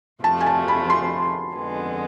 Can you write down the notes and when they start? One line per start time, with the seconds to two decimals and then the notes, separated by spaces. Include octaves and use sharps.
0.23 F2 C3 F3 A3 A5
0.40 G#5
0.46 A5
0.68 B5
0.90 C6
1.55 F2 D3 G#3 B3